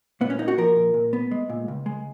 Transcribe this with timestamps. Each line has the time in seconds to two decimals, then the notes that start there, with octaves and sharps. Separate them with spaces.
0.21 A#2 B3
0.30 C#4
0.39 A#3 D#4
0.48 F#4
0.58 F3 A#4
0.76 A#2
0.94 A#2
1.13 B3
1.31 G#3
1.49 A#2
1.68 C#2
1.86 G#3